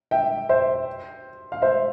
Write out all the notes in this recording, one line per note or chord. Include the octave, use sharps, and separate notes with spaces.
E5 G5
C5 E5
F5
C5 E5